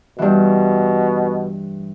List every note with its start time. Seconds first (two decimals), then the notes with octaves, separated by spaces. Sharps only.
0.19 G2 B2 E3